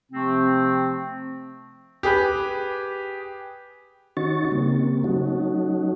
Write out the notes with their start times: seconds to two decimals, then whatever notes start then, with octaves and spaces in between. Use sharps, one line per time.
0.12 C3 F3 A3 C4
2.03 G4 G#4 B4
4.17 D#3 C#4 D#4 F#4 C#6 A6
4.52 C#3 G3 A#3 C4
5.04 F#3 A3 C#4 D#4 F#4